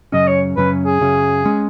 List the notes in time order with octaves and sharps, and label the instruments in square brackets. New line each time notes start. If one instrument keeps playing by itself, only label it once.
[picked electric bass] F#2 C#3 F#3 C#4 [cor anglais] D#5
[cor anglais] C#5
[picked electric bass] F#2 C#3 F#3 C#4 [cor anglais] B4
[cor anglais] G#4
[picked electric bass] F#2 C#3 F#3 C#4
G#3 C#4